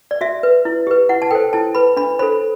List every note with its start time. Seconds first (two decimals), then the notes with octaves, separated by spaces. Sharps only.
0.11 D5
0.21 F#4 E5
0.43 B4
0.65 E4
0.87 G4 B4
1.09 E4 F#5
1.22 A5
1.31 A4 C5 G5
1.53 E4 A5
1.75 B4 B5
1.97 D4 B5
2.19 A4 C5 B5